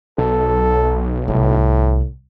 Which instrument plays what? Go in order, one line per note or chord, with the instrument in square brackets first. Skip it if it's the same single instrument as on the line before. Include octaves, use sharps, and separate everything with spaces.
[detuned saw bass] B1 [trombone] A4
[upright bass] C2 [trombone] A2